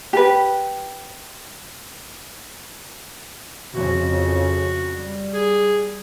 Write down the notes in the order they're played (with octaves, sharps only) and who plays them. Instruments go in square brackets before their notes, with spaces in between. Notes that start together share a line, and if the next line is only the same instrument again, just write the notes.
[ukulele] G4 B4
[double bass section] F2 C#3 [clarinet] F#4
[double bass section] G3
[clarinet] G#4